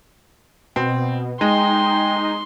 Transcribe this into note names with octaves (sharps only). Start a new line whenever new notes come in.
B2 C4
G#3 D#4 G5 C6